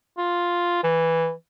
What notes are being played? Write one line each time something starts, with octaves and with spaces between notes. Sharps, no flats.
F4
E3